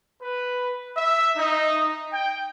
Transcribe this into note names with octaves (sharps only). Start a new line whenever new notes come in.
B4
E5
D#4
G5